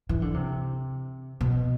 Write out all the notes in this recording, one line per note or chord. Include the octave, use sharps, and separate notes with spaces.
E3
D3
C3
B2